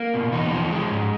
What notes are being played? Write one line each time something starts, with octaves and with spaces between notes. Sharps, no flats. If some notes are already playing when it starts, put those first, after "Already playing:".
Already playing: A#3
B2
E2 D#4
F3
G#3
G#2